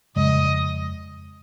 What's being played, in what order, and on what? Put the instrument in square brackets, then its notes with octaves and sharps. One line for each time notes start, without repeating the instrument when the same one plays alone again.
[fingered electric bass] F2 C#3 G#3 [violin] D#5